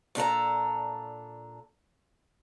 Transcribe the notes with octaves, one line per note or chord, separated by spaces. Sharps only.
A#2 D4 A4 A#5